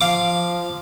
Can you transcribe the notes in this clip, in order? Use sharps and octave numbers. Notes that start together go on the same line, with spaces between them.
F3 F5 D6